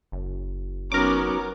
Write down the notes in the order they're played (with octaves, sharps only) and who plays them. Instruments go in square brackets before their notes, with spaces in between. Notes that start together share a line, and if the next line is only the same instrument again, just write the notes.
[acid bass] F#1
[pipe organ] F#3 D#4 F#4 [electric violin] B3 C#4 [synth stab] A#4 D6